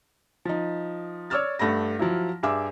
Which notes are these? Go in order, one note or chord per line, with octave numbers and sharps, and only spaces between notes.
F3 D#4
C#5 D5 D6 E6 F6 A6
G2 A3 F#5 B5 A#6
F3 F#3 E4
G2 G#4 E5 D6 E6